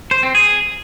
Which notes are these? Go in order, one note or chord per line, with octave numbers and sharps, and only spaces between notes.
C5
C4
G#4